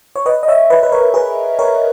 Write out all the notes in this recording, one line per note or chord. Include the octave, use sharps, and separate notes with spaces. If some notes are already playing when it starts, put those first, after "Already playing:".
C#5
B4 D#5
D#5
C#5 E5
B4 D#5
B4
A#4 C#5
G#4 B4
A#4 C#5